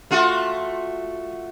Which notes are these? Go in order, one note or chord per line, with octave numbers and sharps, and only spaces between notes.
A3 F4 F#4